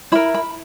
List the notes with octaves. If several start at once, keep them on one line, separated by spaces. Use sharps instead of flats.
E4 A#4 B5
B5